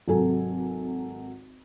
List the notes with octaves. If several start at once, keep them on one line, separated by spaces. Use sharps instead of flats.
G#1 C3 F#3 A4 G#5